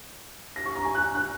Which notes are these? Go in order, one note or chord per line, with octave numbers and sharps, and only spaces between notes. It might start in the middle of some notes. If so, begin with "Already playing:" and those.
A#6
C#6
A#5
G#5
F#6
F#6